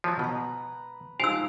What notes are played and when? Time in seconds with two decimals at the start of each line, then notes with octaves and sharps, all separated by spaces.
0.04 F3 F#3
0.19 B2 B4 A#5
1.20 F3 G#3 D#4 F5 G#5 E6